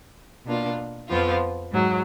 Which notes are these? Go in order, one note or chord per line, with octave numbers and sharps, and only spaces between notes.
B2 A#3 D4 F4
F2 F3 B3 F4
G#2 F#3